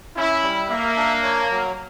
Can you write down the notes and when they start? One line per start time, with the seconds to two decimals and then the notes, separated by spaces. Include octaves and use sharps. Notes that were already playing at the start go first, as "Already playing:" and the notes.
0.16 C#4 E4
0.43 G3
0.69 A#3 E5
0.97 D4
1.23 C#5
1.51 F#3